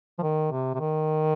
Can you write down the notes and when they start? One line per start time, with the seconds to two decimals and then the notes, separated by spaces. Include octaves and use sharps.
0.18 F3
0.23 D#3
0.51 C3
0.75 C3
0.80 D#3